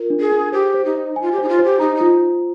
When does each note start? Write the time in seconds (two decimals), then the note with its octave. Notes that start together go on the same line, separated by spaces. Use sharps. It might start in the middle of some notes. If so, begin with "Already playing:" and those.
Already playing: F4 A#4
0.10 D4
0.20 G#4
0.32 D4
0.52 G4 C5
0.74 C5
0.85 D#4
0.95 D#5
1.16 G#5
1.21 F4
1.32 G4
1.38 D#4 C5
1.49 F4
1.59 C5
1.64 G4
1.80 D#4 A#5
1.96 D#4
2.01 F4